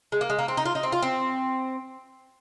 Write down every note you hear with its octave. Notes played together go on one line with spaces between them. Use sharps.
G#3
A#3
G#3
A#3
C4
D#4
F4
D#4
C4
F4
C4